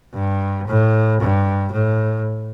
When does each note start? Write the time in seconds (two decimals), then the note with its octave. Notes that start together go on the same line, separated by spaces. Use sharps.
0.14 G2
0.67 A2
1.20 G2
1.72 A2